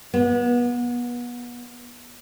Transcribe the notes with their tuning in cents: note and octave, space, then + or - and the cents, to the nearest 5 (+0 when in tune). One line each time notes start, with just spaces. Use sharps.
B3 -30